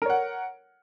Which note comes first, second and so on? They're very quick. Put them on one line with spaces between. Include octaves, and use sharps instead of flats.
A#4 C#5 F#5